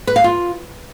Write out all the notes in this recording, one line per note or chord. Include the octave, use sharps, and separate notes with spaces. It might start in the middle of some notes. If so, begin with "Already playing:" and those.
B4
F5
F4